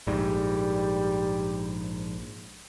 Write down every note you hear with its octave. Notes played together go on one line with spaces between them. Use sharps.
A#1 G#2 G3